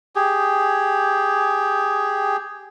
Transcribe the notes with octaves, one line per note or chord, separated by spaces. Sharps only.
G4 G#4